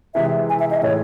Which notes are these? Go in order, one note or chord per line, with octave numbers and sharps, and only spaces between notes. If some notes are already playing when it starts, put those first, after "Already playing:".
C3 E3 G#3 E5
G#5
E5
D#5
A2 E3 G#3 C#5